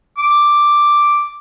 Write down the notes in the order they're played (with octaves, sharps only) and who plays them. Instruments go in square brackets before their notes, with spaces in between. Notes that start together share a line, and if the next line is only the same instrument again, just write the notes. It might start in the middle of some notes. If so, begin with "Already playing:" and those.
[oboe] D6